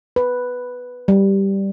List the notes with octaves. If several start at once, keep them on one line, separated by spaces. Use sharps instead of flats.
B4
G3